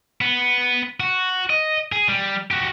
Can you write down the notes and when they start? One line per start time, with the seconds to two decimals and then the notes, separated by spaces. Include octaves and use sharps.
0.21 B3
1.00 F#4
1.50 D#5
1.92 G#4
2.08 G3
2.51 F#4 G4